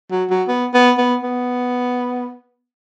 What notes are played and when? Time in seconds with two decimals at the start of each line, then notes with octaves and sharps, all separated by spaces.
0.11 F#3
0.30 F#3
0.48 B3
0.74 B3
0.98 B3
1.23 B3